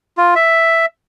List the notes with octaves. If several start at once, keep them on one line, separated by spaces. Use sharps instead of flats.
F4
E5